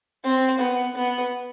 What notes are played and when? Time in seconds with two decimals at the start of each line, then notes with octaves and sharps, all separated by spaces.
0.24 C4
0.59 B3
0.95 B3